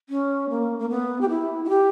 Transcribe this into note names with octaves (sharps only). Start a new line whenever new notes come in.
C#4
A#3
A#3
B3
G4
E4
E4
G4